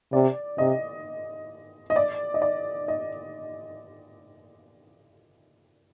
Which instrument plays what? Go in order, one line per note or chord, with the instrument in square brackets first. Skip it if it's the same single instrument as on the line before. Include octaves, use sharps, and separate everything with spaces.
[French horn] C3 [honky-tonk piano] D5
[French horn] C3 [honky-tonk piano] D#5
[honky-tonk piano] D#5
D5
D#5
D5
D#5